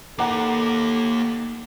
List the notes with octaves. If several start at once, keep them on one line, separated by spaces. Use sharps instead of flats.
A#3 D#4 A4 F#5 A#5 D6